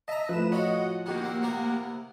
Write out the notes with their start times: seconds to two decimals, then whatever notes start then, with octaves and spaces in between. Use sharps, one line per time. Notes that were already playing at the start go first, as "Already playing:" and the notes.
0.08 D#5 E5 A5 A#5
0.29 A2 F3 B4 E7
0.52 F4 F#4 C#5 D#5 F#5
1.06 B2 D#3 A#3 G4 F#5
1.24 C4
1.42 C3 B3 A#4